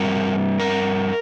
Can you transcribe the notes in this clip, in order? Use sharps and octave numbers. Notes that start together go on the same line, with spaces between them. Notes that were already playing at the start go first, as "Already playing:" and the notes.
Already playing: G2 G3 C4 A#4
A#4